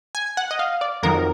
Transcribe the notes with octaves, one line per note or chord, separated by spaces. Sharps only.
G#5
F#5
D#5
F5
D5
F2 D#3 F#3 A#4